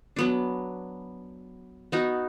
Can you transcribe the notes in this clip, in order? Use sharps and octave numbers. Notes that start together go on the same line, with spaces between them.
F#3 B3 D4
B3 D#4 F#4